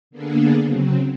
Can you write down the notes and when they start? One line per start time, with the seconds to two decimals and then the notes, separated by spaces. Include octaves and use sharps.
0.11 D3 A#3 B3 D4 G#4 A4
0.63 C#3 F#3 C4